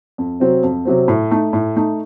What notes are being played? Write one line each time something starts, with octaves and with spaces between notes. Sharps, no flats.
F2
C3 F#3 C4
F2
C3 F#3 C4
A2
A3 D#4
A2
A3 D#4